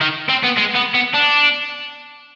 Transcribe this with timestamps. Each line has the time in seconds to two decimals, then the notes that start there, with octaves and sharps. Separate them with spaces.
0.01 D#3
0.29 C4
0.44 B3
0.58 G#3
0.76 B3
0.95 B3
1.14 D4